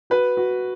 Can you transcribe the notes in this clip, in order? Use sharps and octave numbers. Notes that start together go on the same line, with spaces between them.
F#4 B4
F#4